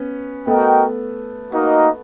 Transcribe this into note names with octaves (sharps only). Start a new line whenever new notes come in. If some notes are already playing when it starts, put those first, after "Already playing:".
Already playing: B3 C#4
A3 B3 F#4 A#4 D#5 G5
A#3 D#4 F#4 A#4 D#5